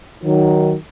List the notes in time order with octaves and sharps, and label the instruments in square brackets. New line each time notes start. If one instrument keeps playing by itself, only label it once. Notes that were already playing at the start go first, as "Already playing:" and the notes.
[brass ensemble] D#3 F#3